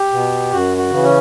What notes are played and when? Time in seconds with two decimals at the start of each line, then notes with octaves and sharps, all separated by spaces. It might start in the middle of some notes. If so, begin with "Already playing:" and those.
Already playing: G4
0.12 B2
0.51 F#2 F#4
0.77 F#4
0.90 C#3 E3
1.03 C#4